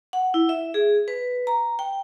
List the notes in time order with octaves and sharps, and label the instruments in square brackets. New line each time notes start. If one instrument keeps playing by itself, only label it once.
[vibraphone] F#5
E4
E5
G#4
B4
A#5
G5